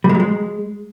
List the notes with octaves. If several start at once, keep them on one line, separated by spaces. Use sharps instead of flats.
G3
G#3
F#3
G#3